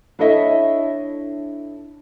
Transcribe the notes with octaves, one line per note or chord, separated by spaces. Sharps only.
D4 E4 A4 C#5 D#5 E5